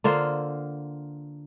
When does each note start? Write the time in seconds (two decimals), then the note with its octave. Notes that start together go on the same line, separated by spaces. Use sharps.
0.04 D3 A#3 F4 C5